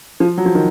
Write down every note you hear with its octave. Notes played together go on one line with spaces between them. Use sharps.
F3
F#3
F3
D#3